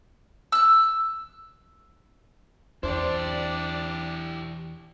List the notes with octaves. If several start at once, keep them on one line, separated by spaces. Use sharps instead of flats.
E6 F#6
E2 D4 E4 G4 C5 D5